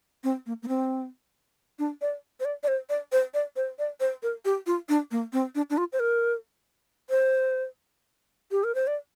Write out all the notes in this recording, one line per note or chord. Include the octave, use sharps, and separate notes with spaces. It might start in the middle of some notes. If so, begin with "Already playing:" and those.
C4
A#3
A#3
C4
D4
D5
C5
D5
D5
C5
D5
C5
D5
C5
D5
C5
A#4
G4
F4
D4
A#3
C4
D4
D4
F4
C5
A#4
C5
G4
A#4
C5
D5